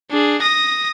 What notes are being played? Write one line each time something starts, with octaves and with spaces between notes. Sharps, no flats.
D4 G#4
D#6 A#6